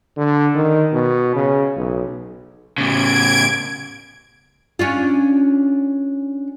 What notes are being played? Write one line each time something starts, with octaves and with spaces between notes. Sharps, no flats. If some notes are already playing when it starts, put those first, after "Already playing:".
D3
D#3
B2
C#3
B1
A2 C#3 G#6 D7
C#4 D4 F4